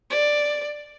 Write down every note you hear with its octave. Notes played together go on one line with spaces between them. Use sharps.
D5